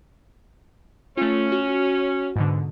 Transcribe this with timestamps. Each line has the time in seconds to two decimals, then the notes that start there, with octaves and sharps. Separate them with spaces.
1.17 A3 C#4 F4
1.52 F#4
2.36 G#2 B2 D3